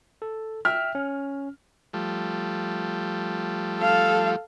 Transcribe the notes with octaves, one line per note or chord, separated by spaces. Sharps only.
A4
E5 G5 F6
C#4
F3 G3 A3
A4 F5